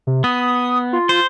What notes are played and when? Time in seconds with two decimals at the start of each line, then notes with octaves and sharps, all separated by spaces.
0.07 C3
0.24 B3 D#6
0.93 F4
1.09 C5